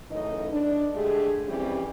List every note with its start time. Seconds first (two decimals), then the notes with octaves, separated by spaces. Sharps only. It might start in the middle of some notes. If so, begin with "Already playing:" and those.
0.11 F#2 C#3 E3 A3 D#4 D#5
0.51 D4
0.94 D3 G#3 A3 G4 G#4
1.47 F2 E3 G3 C4 C#4 G4